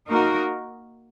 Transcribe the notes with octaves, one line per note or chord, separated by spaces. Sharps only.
A#3 D#4 F#4 A#4